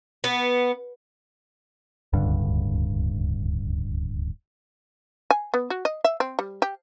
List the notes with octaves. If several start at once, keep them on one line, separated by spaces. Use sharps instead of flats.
B3
D1 C#2 G2 D3
G#5
B3
F#4
D#5
E5
C4
G3
G4